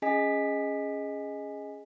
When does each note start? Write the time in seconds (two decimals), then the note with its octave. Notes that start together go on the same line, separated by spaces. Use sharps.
0.02 C#4 G#4 D#5 G#5 B6